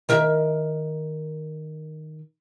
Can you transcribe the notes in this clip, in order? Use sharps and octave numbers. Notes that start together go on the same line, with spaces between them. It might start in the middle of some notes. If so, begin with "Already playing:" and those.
D#3 A#4 E5